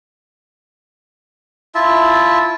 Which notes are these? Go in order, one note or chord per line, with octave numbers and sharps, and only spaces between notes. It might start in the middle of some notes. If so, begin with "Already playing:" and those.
E4 F4 E5 A5